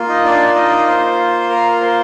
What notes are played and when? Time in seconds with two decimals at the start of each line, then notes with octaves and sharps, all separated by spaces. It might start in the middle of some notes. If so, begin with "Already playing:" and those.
Already playing: A#3 F4
0.09 D#4 D#5
0.25 D4 D5
0.56 D#4 D#5
0.87 C5
1.50 A#4
1.81 C5